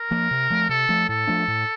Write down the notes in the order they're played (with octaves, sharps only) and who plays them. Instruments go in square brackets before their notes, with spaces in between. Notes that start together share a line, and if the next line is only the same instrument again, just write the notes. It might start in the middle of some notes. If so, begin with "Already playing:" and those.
Already playing: [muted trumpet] A#4
[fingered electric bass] F3 A#3
C3
F3 A3
[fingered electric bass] C3 [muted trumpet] A4
[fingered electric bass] F3 A3
[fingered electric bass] A2 [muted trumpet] A4
[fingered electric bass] F3 A3 D4
A2